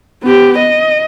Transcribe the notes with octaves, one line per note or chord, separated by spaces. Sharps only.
B3 G4
D#5